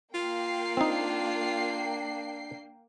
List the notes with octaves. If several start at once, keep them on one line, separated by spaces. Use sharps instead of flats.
A#3 F4 G5 C7
C4 D4 D#4